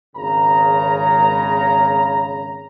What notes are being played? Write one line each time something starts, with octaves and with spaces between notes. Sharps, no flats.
G#1 C#3 A#5